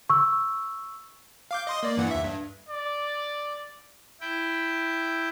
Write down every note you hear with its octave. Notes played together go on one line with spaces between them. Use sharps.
C#6 E6
F5 D6 G6
D#5 C6 D#6
A#3 D5
G2 E3 F#5
D#2 E5
G2
D5
E4 G5